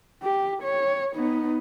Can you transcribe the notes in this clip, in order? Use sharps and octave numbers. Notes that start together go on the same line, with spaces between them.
G4
C#5
B3 D#4